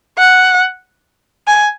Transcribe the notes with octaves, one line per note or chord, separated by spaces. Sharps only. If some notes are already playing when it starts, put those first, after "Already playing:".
F#5
G#5